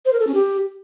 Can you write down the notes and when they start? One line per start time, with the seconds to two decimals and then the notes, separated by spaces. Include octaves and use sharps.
0.05 C5
0.13 A#4
0.20 A4
0.27 C#4
0.34 G4